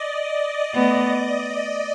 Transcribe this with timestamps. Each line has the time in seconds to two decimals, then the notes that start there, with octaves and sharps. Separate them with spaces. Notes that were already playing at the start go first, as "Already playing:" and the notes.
Already playing: D5 D#5
0.74 A3 B3